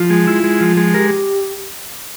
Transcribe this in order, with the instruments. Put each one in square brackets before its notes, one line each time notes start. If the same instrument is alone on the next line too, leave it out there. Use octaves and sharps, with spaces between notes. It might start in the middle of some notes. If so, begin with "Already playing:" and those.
Already playing: [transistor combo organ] F3 [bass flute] F4
[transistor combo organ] G#3
E4
G#3
F3
G#3
[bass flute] G4 [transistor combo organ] A#4